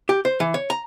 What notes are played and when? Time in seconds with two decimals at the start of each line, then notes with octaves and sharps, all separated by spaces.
0.09 G4
0.25 C5
0.40 E3
0.54 C#5
0.70 A#5